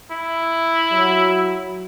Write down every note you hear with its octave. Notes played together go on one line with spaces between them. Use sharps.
E4
F#3